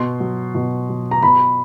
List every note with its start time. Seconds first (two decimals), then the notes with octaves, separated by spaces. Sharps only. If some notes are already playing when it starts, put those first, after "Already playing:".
Already playing: B2 C6
0.20 F#3
0.55 B2
0.89 F#3
1.11 A#5
1.23 B2 B5